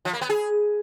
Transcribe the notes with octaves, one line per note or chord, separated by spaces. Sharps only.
F3
A#3
B3
G#4